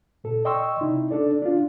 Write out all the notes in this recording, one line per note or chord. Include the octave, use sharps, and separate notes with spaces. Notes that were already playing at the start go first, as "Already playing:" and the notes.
A#2 A4
D5 D#5 G5 C6 C#6 E6
C3 D#4 E4
D4 A4 D5
D4 F4